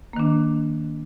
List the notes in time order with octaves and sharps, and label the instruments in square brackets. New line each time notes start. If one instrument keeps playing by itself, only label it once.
[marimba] A#3
D#3
D4